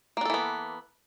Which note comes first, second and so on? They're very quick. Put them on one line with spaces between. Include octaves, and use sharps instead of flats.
A#3 D4 A4 E3 B3